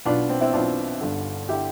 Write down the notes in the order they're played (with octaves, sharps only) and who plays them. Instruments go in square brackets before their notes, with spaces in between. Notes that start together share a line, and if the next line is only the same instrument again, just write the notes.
[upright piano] B1 B2 B3 D4 F4
C4
C4 E4
B1 B2 B3 D4 F4
G1 G2 D3
D3 E4 G4